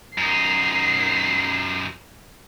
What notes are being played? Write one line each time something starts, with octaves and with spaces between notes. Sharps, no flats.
F#2 D#4 C7